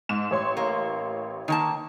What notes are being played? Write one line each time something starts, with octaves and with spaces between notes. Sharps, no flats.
G#2 E7
A1 C#5 C6
A#3
D#3 A#3 A5